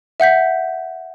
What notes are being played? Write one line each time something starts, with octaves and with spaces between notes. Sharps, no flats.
E5 F#5 G6 B6